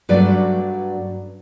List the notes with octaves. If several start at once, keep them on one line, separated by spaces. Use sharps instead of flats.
G2 F#3 A3 D4 B4 D5